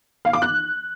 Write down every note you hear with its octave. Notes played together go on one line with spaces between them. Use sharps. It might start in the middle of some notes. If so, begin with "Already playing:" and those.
F5
D6
F#6